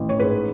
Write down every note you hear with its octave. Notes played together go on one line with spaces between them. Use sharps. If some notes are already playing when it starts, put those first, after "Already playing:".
Already playing: A1
C#5
G#2 B4